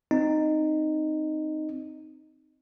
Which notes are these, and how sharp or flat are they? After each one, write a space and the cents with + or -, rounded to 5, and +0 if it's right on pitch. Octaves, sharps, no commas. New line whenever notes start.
C4 +0 D#4 -10